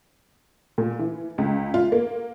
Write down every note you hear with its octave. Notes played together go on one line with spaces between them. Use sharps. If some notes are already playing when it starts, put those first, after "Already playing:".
A#2
E3
C#2
F4
A#3